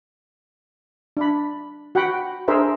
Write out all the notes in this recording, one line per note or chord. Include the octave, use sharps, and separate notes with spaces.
D4 B5
F#4 F#5 G5 B5
D4 G#4 A#4 C5 E5